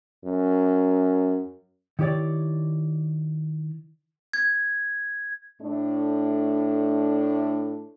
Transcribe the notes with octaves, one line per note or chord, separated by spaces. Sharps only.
F#2
D#3 E4 G4 C#5 D5
G#6
A2 A3 D4